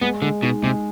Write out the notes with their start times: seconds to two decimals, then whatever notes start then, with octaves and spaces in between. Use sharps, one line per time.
0.01 G#3 B3
0.22 D3 G#3
0.43 B2 D#4
0.63 C3 G#3